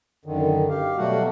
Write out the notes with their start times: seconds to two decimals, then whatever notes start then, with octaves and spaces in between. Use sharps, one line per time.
0.25 F#2 D3 D#3
0.69 G4 F5
0.97 B2 F#3 G3 A3 F#4 F#5